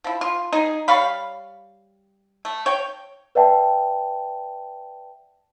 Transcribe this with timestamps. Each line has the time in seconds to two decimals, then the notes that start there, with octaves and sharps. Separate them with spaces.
0.04 F3 E4
0.21 F4
0.53 D#4 G#4
0.88 G3 C#5 F5 B5
2.45 A3
2.66 C#5 G5
3.35 B4 D5 E5 F#5 G5 A5